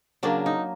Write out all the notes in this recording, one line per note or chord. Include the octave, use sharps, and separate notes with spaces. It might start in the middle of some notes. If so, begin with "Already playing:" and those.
C#3 F#3 A#3 D4
D#4